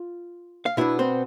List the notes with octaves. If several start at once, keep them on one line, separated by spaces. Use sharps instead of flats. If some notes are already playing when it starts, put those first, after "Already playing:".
Already playing: F4
F5
B2 B3 D4 E4 E5
C4 C5